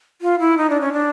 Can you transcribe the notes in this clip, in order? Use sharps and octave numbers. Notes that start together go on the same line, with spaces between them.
F4
E4
D#4
D4
C#4
D4